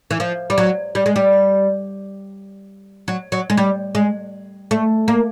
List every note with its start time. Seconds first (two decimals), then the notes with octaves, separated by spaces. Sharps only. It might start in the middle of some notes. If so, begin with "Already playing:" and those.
0.11 E3
0.20 F3
0.50 G3
0.58 F#3
0.95 G3
1.06 G#3
1.16 G3
3.08 F#3
3.32 F#3
3.50 G#3
3.57 G3
3.95 G#3
4.71 A3
5.08 A#3